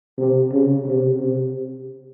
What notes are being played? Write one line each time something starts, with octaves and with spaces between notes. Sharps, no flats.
C3
C#3
C3
C3